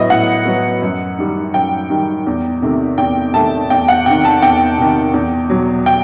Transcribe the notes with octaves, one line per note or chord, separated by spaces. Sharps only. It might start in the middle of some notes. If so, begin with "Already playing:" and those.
Already playing: A2 F#3 B3 E4 D#5
A2 F#5
F#3 B3
F#2
D#3 G3
F#2 G5
D#3 G3
E2
C3 D#3 A3
E2 G5
C3 D#3 A3 A5
E2 G5
F#5
C3 D#3 G5
A5
E2 G5
C3 D#3
E2
B2 F#3
G5